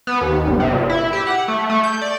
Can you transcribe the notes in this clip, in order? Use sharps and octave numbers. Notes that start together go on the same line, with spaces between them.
B3
D#2
G1
C3
A#2
E4
G4
F#5
A3
A3
G6
D5